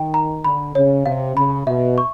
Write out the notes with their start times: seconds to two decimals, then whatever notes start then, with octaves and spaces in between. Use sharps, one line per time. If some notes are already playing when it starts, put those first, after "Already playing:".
Already playing: D#3 G5
0.14 A#5
0.45 D3 B5
0.75 C#3 C#5
1.06 C3 F5
1.36 C#3 B5
1.67 B2 E5
1.98 C#6